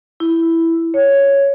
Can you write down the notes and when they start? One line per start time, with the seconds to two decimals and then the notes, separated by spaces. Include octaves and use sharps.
0.20 E4
0.94 C#5